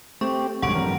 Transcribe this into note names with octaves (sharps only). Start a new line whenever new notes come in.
A3 C4 G4 C#6
A#1 F#2 D3 G3 G#3 F#5 C#6 D7
G2 E3 F#3 C4 A#4